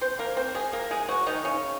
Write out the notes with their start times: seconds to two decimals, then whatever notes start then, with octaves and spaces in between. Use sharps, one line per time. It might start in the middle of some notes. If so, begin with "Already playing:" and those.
0.01 C4 C5
0.19 A#3 A#4
0.37 C4 C5
0.54 G#3 G#4
0.73 A#3 A#4
0.91 G#3 G#4
1.08 F#3 F#4
1.27 D#3 D#4
1.45 C#3 C#4